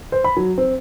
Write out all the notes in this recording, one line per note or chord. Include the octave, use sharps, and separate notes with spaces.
C5
B5
F#3
C4